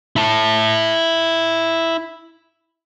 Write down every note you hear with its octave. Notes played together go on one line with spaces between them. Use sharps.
E4 A5